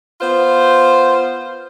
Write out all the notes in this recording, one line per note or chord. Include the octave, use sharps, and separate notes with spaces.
B3 F4 C5